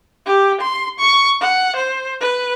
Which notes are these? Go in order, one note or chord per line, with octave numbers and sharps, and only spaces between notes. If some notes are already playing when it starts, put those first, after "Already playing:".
G4
C6
C#6
F#5
C5
B4